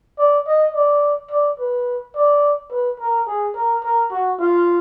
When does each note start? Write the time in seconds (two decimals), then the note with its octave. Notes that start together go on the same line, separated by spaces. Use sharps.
0.18 D5
0.47 D#5
0.74 D5
1.31 D5
1.59 B4
2.15 D5
2.71 B4
3.00 A#4
3.27 G#4
3.55 A#4
3.83 A#4
4.11 F#4
4.40 F4